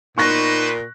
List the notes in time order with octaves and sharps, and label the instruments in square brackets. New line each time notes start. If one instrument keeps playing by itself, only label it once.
[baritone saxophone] A#2 [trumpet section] B3 B4 C5 [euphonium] D#4 [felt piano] C#6 F#6 A#6